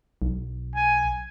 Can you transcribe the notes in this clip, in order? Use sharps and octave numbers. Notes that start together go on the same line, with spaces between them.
B1
G#5